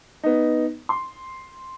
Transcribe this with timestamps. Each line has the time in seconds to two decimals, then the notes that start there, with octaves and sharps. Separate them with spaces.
0.23 B3 D#4
0.89 C6